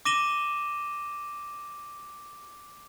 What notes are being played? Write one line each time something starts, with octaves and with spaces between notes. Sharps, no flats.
D6 A#6 D#7 E7 G7